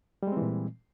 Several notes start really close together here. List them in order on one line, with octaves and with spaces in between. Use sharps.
G3 G#3 C4 E3 A#2